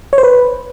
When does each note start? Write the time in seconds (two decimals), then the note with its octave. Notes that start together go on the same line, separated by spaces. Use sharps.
0.13 C#5
0.18 C5
0.23 B4